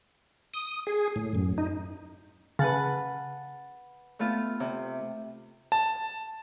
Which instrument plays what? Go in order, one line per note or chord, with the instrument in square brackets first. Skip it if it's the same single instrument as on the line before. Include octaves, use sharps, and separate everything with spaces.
[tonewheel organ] D#6
G#4
A2
F#2
D#4
[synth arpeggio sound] C#3 [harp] B4 F#5 A5
[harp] A3 B3 F4
C3
[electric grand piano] A5